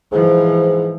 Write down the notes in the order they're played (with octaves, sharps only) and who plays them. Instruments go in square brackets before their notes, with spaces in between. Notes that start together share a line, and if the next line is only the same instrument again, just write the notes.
[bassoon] G#2 [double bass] E3 F3